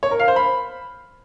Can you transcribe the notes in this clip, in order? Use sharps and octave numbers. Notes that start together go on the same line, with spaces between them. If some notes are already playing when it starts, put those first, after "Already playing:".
C#5
A#4
F5
C5
B5